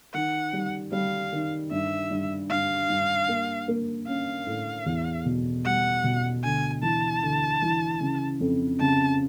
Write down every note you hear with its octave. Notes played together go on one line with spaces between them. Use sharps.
D#3 F#5
G3
G3 F5
D#3
G2 E5
G2
G2 F5
G2
A#3
A#3
C#4 F5
A2
E2
B2
G3 F#5
B2
D2 G#5
E3 A5
D2
E3
C#3
F2
C#3 A5